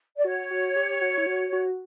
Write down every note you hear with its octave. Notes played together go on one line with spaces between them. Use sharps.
D5
F#4 C#5
F#4
G4
F#4
E4
F#4
F#4